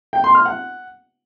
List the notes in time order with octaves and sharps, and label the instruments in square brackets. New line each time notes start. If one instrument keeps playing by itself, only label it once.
[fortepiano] G5
C6
F6
F#5